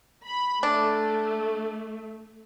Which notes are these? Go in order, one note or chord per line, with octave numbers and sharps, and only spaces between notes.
B5
A3 D4